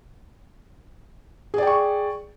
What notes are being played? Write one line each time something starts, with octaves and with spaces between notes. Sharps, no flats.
G#4 D5 G5 C#6